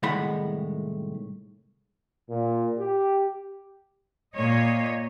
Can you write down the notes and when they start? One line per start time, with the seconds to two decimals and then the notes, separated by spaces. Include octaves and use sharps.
0.03 C2 A2 D#3 G#3 F#5 B5
2.28 A#2
2.79 G4
4.35 A#2 C#5 D#5